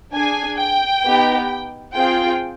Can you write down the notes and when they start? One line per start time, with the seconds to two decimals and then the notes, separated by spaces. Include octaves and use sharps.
0.13 D4 G#4 G#5
0.58 G5
1.04 B3 D#4 G4
1.94 C4 F4 G#4 G5